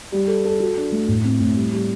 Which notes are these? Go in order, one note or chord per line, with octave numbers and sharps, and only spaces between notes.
G3
A4
A4
F#4
D4
A3
A2
C4
A2
G3
G3